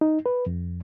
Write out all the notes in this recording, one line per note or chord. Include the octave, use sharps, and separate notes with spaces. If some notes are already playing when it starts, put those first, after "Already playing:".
D#4
B4
F2